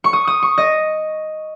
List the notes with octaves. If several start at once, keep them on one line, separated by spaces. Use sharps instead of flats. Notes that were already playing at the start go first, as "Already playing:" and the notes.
C#6
D#6
D#6
C#6
D#5